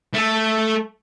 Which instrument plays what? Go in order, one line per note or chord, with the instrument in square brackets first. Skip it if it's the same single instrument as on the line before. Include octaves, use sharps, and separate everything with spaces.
[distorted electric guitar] A3 A4